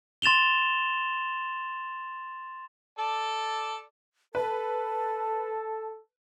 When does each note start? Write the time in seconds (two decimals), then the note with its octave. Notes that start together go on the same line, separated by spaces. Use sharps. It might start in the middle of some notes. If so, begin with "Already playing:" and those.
0.22 C6 A6 E7 F7 G7
2.99 A4 D5 A5
4.35 A4 B4 A5